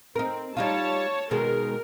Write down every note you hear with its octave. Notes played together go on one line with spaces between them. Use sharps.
C4 D#4 A#4
G3 D#4 F4 C#5 A5
B2 D#3 G#3 A#4